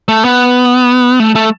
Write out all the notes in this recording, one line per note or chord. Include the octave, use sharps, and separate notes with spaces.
A3
B3
A3
A3